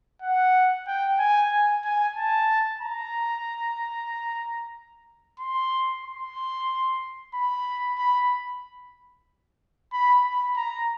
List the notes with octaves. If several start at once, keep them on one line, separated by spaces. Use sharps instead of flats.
F#5
G5
G#5
G#5
G#5
A5
A#5
C6
C6
B5
B5
B5
B5
A#5